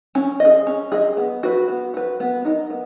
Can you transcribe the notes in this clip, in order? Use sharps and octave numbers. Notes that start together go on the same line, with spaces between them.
C#4
D#5
G#4
C#4
G#4 D#5
B3
F#4 B4
B3
F#4 B4
B3
D#4 A#4 D#5
B3